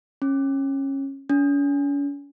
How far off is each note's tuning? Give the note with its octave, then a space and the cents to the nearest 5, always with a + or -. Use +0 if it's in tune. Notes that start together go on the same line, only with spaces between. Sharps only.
C#4 -20
C#4 +40